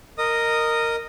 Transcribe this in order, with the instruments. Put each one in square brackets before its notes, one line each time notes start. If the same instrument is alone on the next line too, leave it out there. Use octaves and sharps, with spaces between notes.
[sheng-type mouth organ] A#4 D#5 D#6